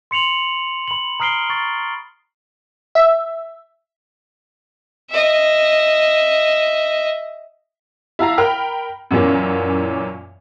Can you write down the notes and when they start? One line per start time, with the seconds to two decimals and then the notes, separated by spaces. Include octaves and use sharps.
0.11 C6 C#7 F7 F#7
0.88 B5 F#7
1.20 A#5 D#6 F6 C7 D7 G7
1.50 C#6 A6
2.95 E5
5.10 D#5 E5
8.19 E4 F5 A5 A#5
8.38 A#4 G5 B5 F6
9.11 F#2 A#2 E3 A#3 C#4